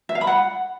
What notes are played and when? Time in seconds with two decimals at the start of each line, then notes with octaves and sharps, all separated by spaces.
0.09 E5
0.15 F5
0.21 B5
0.27 F#5